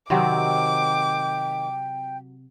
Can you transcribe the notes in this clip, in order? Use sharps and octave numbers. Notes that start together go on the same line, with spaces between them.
C3 D#3 F#3 C4 G5 D6